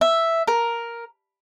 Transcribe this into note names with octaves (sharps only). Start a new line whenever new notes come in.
E5
A#4